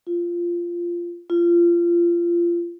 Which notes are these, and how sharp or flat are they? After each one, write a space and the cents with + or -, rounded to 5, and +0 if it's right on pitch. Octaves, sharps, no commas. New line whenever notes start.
F4 -10
F4 -25